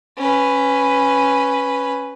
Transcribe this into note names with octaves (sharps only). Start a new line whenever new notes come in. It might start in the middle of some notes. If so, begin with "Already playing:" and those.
C#4 B4